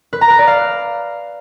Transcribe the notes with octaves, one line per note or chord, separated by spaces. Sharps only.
B4
A#5
B4
D5
F5